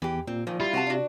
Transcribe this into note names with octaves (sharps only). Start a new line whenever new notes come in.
E2 E3 G4
A#2 C4
A#2 D#3 F3
G3 E4 F4
C3 F#4 F#5 A5
D4 F#4